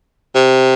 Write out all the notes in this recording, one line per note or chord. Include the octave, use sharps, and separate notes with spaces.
C3